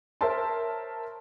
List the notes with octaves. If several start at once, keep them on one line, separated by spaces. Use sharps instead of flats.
A#4 C5 C#5 E5 A5 C6